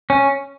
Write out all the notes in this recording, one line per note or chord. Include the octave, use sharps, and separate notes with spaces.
C#4